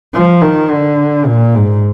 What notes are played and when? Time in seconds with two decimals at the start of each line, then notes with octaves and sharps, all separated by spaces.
0.14 F3
0.42 D#3
0.71 D3
1.27 A#2
1.55 G#2